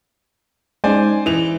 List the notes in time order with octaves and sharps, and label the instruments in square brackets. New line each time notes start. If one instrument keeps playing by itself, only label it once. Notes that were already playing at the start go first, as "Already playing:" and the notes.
[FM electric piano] G#3 C#4 D#4 [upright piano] C5 D5 G#5
[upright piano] E3 F7